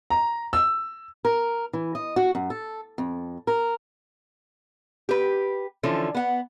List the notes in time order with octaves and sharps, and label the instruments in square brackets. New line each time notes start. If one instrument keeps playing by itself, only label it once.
[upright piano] A#5
E6
[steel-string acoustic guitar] A#4
E3
D#5
F#4
F#2
A4
F2
A#4
[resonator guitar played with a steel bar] G4 B4
D3 E3 F3 C#4 A4
B3 F#5